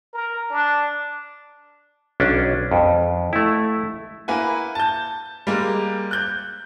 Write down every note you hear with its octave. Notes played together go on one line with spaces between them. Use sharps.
A#4
D4
B1 C#4 D4
F2
A3 E4
A#3 E4 B4 F#5 G#5
A5 G6
G3 G#3 A#3
F#6 G6